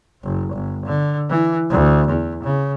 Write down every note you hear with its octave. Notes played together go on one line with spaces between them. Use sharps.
F#1
G1
D3
E3
D2
E2
C#3